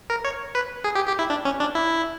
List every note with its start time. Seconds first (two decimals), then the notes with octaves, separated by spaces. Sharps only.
0.10 A#4
0.25 C#5
0.55 B4
0.84 G#4
0.95 G4
1.07 G4
1.19 E4
1.30 D4
1.45 C#4
1.60 D4
1.75 E4